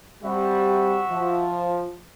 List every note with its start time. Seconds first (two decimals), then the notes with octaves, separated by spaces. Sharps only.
0.23 C3 G3 F#4 E5
1.10 F3